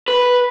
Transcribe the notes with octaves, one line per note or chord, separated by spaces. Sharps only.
B4